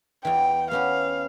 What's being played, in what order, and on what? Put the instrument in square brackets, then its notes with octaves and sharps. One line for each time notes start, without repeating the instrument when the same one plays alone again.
[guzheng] E2 E3 [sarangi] G5
[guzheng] B3 C#4 G4 [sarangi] F5